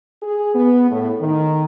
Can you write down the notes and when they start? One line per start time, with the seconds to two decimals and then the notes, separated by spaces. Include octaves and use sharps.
0.22 G#4
0.55 B3
0.91 A2
1.20 D#3